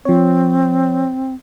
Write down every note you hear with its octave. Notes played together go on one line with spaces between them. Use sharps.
F3 C4 C#5